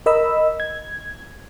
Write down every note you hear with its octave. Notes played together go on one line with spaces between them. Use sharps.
A#4 D#5 B5 E6
G#6